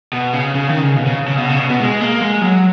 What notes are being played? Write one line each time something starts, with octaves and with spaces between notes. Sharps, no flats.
B2
C#3
C#3
D#3
C#3
B2
C#3
C#3
B2
C#3
B2
B2
G#3
A#3
G#3
F#3